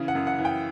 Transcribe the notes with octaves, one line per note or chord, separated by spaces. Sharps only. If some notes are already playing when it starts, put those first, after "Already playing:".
Already playing: C#3 E3
F#5
F#2
F#5
E3
G5